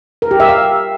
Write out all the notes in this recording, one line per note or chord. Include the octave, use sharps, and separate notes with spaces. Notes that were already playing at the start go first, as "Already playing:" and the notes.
A#4
G4
E5
F5